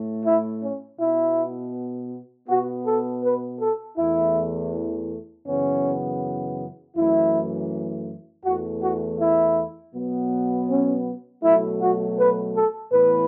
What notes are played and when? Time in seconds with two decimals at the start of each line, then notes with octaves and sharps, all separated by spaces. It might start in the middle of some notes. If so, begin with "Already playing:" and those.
Already playing: A2 A3
0.25 E4
0.63 C#4
0.99 B2 B3 E4
2.48 B2 B3 F#4
2.86 A4
3.23 B4
3.60 A4
3.97 E2 E3 A3 E4
5.47 F#2 C#3 E3 B3 C#4
6.95 F#2 E3 A3 E4
8.44 E2 E3 A3 F#4
8.82 F#4
9.20 E4
9.94 B2 F#3 B3
10.69 C#4
11.43 B2 F#3 A3 E4
11.80 F#4
12.18 B4
12.56 A4
12.92 A2 E3 B3 B4